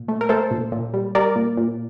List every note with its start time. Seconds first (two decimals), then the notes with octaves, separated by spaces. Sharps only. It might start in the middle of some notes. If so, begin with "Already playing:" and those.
Already playing: A#2
0.08 A3
0.21 A#4
0.29 A3 A4 C5
0.51 A#2
0.72 A#2
0.94 G3
1.15 G3 A#4 D5
1.36 A#2
1.57 A#2